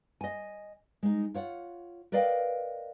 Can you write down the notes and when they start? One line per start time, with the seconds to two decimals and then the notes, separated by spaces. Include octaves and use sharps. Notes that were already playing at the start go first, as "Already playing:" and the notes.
0.21 D#5 G#5
1.03 G#3 D#4
1.34 F4 C#5 F#5
2.12 A#4 B4 D5 D#5 F5 G5